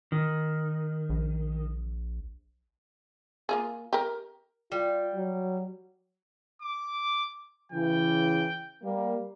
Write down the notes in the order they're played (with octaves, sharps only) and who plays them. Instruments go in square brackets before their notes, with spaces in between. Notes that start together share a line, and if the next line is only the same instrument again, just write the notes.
[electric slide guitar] D#3
[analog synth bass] A#1
[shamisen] A#3 F4 G#4
G4 A#4
[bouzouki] G3 [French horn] F4
[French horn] F#3
[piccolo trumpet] D6
[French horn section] C#3 E3 [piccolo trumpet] G5
[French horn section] G3 A#3